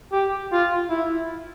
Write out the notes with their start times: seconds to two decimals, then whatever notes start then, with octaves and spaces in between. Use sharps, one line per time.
0.12 G4
0.52 F4
0.89 E4